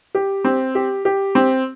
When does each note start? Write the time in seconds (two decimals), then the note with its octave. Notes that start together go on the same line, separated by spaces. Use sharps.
0.15 G4
0.44 C4
0.75 G4
1.05 G4
1.35 C4